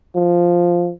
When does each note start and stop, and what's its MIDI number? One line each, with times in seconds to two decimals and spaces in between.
0.15 0.92 53